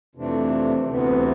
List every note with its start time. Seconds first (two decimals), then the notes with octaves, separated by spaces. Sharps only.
0.15 F2 C3 E3 A3 D4
0.87 D2 C3 E3 B3